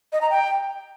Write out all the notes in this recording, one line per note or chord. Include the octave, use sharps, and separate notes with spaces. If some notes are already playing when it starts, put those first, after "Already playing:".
D#5
A#5
G5